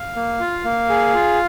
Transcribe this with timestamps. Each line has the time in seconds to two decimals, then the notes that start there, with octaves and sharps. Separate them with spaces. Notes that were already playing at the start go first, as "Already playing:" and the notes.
Already playing: F5
0.15 A#3
0.40 F4
0.64 A#3
0.90 G#4
1.15 F4